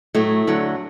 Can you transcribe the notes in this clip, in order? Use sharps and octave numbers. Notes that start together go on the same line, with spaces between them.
A2 F#3 A3
D2 D3 F#3